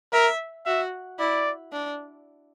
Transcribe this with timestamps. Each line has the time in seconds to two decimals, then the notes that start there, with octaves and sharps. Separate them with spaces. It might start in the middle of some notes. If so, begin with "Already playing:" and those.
0.13 A#4 E5
0.66 F#4 E5
1.19 E4 D5
1.73 D4